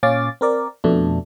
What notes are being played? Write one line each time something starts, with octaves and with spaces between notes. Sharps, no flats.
A#2 C#4 F5 D6 A6
C4 A#4 D5
F2 B2 A3 D4